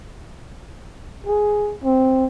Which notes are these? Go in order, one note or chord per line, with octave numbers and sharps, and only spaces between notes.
G#4
C4